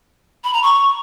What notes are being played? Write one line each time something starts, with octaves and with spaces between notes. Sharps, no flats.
B5
A#5
C#6